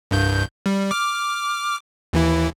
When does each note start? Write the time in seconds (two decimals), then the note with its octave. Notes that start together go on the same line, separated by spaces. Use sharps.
0.11 C2 G2 G6
0.66 G3
0.91 D6 F6
2.13 D#2 E3 E4